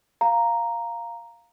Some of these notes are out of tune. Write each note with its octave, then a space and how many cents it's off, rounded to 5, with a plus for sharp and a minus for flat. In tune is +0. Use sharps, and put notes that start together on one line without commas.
F5 +0 A#5 +0